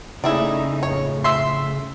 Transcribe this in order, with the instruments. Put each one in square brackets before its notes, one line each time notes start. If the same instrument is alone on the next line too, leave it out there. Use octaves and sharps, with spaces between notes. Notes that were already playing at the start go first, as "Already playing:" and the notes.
[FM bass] C#3 [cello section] A3 C#4 D#4 [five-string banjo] E4 G#4 D5
[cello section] F2 A2 [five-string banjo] C#5
[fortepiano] E5 C6